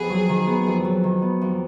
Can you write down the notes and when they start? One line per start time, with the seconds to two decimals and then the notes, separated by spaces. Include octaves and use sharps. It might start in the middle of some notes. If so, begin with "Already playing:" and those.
Already playing: F2 B3 G#4
0.10 F#3
0.29 D#3
0.47 B3
0.66 F2
0.85 F#3
1.04 D#3
1.22 B3
1.41 F2